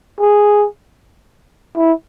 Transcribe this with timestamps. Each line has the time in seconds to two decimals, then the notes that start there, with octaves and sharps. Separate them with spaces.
0.20 G#4
1.77 E4